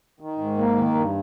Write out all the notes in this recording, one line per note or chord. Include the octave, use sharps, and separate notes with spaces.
D#3
G#2
A#3
D#3
G2